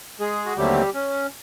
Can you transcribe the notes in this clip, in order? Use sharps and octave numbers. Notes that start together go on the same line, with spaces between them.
G#3 G#4
F#4
D#2 D3 F#3 G3 A3 C4 G4
C#4